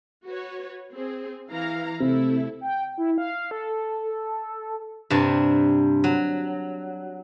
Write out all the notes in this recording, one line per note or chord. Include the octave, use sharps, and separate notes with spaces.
F#4 B4 C#5
C4 G#4
E3 F5 A#5
C3 A3 E4 A4
G5
E4
F5
A4
G2 C3 D4 A5
F#3